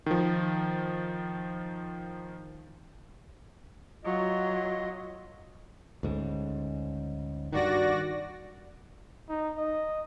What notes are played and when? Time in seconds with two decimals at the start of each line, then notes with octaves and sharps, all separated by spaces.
0.06 D#3 F3
4.05 F#3 F4 D#5
6.03 D2 G#2 C#3
7.52 G2 D#3 F#4 D5 A#6
9.29 D#4
9.58 D#5